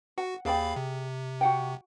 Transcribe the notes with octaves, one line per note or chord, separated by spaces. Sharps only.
F#4 F#5
D#2 G#4 D5 F5 G5 B5
C3
F#4 F#5 G5